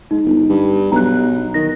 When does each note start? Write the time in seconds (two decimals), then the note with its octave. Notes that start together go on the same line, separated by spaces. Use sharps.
0.11 G#2 D#4
0.25 G1
0.49 G2
0.92 B1 A#5 F#6
1.54 D#3 A#6